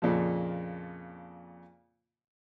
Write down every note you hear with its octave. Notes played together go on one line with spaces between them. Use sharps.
F2 A#2 C#3 F3